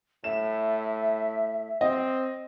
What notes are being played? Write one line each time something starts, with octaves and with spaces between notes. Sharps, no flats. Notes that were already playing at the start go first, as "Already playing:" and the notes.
A2 E5 E7
C4 D#5